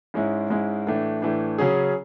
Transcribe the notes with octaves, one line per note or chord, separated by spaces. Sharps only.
G#2 G#3 C#4 E4
G#2 G#3 C#4 E4
A2 E3 A3 D4
A2 E3 A3 D4
C#3 F#3 C#4 G#4